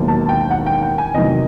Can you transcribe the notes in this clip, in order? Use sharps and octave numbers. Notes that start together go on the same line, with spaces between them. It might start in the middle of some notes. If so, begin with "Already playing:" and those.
Already playing: E1 D#2 D#3 F#3
A5
G5
F#5
G5
G5
G#5
E2 C3 D#3 F#3 D#5